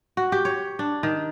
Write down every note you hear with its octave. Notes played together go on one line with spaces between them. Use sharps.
F#4
G4
C#5
D4
D#3